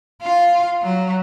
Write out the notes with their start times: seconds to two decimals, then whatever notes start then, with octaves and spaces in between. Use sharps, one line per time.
0.22 F4 F5
0.83 F#3